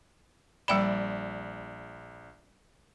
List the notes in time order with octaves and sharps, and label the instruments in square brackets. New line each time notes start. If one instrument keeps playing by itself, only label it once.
[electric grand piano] A#1 D5 E7 [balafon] G3 G5 B5